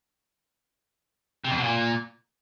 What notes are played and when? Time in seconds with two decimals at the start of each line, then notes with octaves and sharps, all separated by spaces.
1.44 C3
1.51 F2
1.57 B2
1.63 A#2